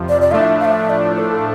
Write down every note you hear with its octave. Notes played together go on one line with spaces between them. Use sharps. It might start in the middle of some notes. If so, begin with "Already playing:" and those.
Already playing: F2 C3 F3
D5
D5
A2 F3 A3 D4 E5 F5
F5
E5
D5
A4